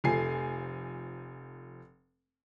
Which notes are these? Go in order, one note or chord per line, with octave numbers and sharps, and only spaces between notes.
F1 F3 A3 G#5 C7